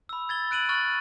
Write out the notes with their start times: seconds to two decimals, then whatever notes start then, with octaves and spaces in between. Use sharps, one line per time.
0.09 B5 E6
0.29 G#6 A6 G7
0.51 F#6 D7 D#7 F#7
0.69 C#6 F6 F#6 A6 F#7